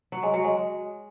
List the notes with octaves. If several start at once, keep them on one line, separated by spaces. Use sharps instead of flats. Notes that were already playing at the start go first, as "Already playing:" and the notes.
F#3
G#3
F#3
G#3